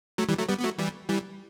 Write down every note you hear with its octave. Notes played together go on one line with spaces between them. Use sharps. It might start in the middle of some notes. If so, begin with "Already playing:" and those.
F#3 A3
E3 G3
F#3 A3
G3 B3
B3
F#3 A3
E3 G3
E3 G3